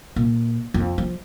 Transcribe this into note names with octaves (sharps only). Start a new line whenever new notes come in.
A#2
F2
F3